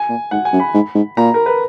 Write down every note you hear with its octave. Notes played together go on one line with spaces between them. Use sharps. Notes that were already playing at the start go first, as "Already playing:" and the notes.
Already playing: G#5
A#2
G#2 F#5
G#5
F#2
B5
G#2
G#2
A#2 A#5
A#4
B4